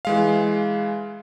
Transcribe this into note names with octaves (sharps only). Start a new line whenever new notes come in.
E3 G#3 F5